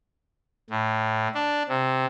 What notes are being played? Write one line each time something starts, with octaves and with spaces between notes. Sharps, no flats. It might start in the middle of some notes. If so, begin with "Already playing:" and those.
A2
D4
C3